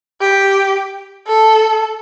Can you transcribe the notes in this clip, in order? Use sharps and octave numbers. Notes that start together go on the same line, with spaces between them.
G4
A4